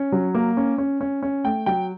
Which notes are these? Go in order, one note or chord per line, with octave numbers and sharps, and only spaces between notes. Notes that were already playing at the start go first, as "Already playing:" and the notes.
Already playing: C#4
F#3
A#3
C#4
C#4
C#4
C#4
A3 G5
F#3 G5